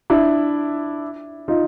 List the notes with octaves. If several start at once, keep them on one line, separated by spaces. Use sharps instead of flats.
D4 E4
D#4 F4